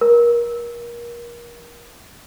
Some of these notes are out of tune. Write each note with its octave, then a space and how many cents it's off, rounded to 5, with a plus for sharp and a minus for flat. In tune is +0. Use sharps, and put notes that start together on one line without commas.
A#4 +30